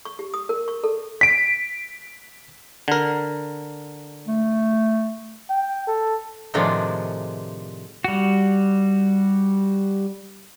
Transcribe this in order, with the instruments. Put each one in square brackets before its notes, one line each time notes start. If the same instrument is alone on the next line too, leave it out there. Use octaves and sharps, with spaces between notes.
[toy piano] C#6
G4
D#6
A#4
C#6
A4
[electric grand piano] B6 D7
[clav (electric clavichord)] D3 A#4
[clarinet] A3
[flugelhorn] G5
A4
[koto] A2 C3 D#3 F3 G#3 D4
[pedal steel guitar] G3 F#4